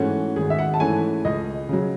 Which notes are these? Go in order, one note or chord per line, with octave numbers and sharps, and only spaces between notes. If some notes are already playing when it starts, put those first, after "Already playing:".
Already playing: G#2 E3 A3 C#4 F#4
G#1 G#4
E5
F#5
A5
G#2 E3 A3 C#4 G#5
C#2 D#5
C#3 F#3